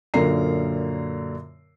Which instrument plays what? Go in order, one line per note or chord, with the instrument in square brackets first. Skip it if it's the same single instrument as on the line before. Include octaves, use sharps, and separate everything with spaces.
[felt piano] F#2 A#2 D3 A#4 A#5 C7